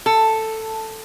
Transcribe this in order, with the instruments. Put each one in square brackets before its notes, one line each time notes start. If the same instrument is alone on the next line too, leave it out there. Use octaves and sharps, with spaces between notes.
[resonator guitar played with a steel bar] A4